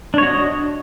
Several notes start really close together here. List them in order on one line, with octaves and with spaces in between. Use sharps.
D4 C#5 F#4 D#5